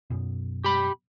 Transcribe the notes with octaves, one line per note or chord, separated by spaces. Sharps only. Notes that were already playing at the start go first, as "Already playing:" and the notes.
F#2 B2
G4 B5